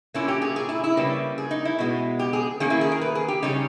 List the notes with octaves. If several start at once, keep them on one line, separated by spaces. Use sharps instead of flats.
A#2 A#3 C#4 E4
G4
G#4
G#4
E4
E4
C#3 G3 A#3 C#4 B4
G#4
D#4
E4
B2 G#3 B3
G4
G#4
D#3 A#3 C#4 G#4
E4
G#4
A#4
B4
G#4
G4
C#3 G3 C#4 D#4